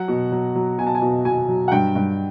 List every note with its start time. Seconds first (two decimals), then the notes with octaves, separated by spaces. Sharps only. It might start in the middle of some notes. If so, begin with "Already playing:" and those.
Already playing: F#3 F#5
0.08 B2
0.32 F#3
0.55 F#3
0.78 B2 G#5
0.87 A5
0.95 G#5
1.02 B2
1.25 B2 G#5
1.49 F#3
1.68 F#5
1.72 G2 G5
1.96 G2